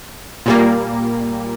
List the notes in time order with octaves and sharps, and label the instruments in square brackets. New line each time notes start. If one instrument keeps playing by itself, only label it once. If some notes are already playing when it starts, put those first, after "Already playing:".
[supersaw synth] A#2 G3 A#3